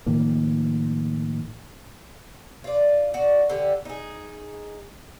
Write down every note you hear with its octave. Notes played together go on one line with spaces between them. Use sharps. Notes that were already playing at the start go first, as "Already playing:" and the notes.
A2 D#3 F3 A#3
F4 D5
F#4 D5
D3 G4
D#4 G#4